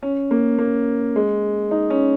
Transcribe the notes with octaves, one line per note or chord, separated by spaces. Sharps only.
C#4
A#3
A#3
G#3
D#4
C#4